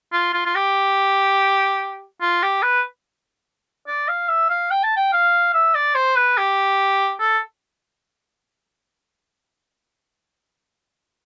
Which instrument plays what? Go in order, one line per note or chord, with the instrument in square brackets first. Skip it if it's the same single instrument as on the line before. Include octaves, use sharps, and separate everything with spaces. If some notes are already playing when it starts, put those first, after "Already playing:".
[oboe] F4
F4
F4
G4
F4
G4
B4
D5
F5
E5
F5
G5
A5
G5
F5
E5
D5
C5
B4
G4
A4